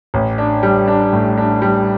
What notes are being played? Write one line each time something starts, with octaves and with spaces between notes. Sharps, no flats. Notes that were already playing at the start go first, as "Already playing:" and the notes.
A1
D4
G3
D4
A2
D4
G3